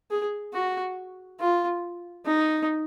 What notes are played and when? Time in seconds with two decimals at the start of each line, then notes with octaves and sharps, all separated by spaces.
0.11 G#4
0.54 F#4
1.40 F4
2.26 D#4